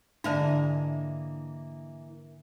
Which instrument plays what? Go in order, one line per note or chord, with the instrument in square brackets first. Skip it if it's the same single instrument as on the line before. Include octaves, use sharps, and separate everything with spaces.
[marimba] G#2 D3 [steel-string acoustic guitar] E3 A#3 D#5 [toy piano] D4 E5 A5